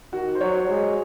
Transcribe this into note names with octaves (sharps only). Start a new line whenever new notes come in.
D#3 F#4
C5
F#3 C#5
G#3